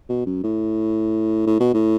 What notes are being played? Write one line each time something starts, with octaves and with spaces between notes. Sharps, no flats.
B2
F#2
A2
A2
B2
A2